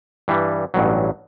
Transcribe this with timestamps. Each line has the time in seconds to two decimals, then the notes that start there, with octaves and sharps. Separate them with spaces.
0.28 G2 E3 G3
0.74 A1 G2 F#3